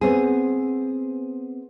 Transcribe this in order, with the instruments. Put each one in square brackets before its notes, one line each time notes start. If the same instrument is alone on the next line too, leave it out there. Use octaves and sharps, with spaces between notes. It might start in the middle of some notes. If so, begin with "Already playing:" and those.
[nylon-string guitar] B3 C4 G#4